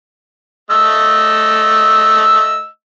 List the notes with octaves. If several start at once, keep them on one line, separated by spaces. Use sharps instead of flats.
A3 D#5 E6